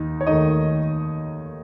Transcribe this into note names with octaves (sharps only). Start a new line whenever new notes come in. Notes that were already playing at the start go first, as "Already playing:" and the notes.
Already playing: D#2 D#3 D#4
C#5
D#2 D#3 A3 D#4 D#5